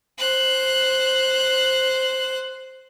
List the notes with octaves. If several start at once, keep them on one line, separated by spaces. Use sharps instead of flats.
C5 F#6